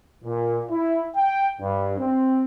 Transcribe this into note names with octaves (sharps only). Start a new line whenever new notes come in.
A#2
E4
G5
G2
C4